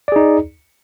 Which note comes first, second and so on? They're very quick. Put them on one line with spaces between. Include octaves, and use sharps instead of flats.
D5 G#4 D#4